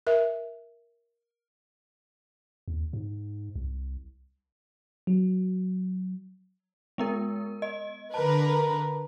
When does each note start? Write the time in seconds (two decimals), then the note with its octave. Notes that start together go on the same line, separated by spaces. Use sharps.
0.07 A#4 E5
2.68 D#2
2.93 G#2
3.56 C2
5.07 F#3
6.98 G#3 B3 A#4
7.62 D#5
8.14 D3 A#4 B4 A5